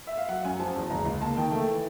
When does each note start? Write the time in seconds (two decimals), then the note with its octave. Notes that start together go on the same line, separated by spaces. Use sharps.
0.07 E5
0.18 F5
0.29 F#3 F#5
0.45 F#2 G#5
0.59 F3 A5
0.76 E2
0.90 C#2 A#5
1.06 C#2
1.21 A#3 A5
1.37 D#3 G5
1.52 A3
1.67 E3